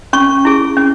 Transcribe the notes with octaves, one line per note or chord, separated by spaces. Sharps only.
C#4 C#6
E4 G#4
C#4